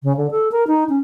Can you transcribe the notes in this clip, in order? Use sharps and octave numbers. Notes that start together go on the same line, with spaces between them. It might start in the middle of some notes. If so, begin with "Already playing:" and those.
C#3
D3
A4
A#4
D#4
C#4